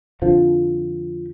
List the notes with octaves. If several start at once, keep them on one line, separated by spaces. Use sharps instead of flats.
F2 D3 F3